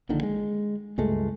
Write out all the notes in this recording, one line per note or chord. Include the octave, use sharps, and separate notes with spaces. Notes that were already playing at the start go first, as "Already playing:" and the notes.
A#1 A#2 D3 D#3
G#3
C#2 G2 G#3 A3